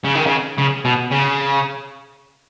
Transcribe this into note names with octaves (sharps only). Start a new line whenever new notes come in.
C#3
D#3
C#3
C#3
B2
C#3